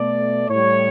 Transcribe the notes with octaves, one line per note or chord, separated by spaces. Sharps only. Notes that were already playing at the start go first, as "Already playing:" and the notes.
Already playing: B2 A3 D5
A2 G3 C#5